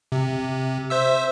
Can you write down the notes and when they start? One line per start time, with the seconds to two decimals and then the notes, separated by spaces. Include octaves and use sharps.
0.12 C3
0.90 C5 E5 E6